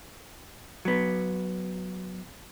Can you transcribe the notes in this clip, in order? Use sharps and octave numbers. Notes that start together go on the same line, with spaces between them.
F#3 B3